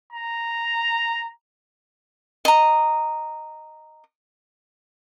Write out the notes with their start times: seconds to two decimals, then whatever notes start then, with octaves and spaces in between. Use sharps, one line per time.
0.13 A#5
2.45 D#5 A#5